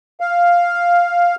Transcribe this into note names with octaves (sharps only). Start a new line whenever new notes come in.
F5